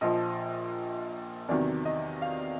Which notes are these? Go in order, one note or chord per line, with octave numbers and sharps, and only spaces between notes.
A#1 A#2 F3 D#5
E2 C3 D#3 F#3 D5
D#5
F5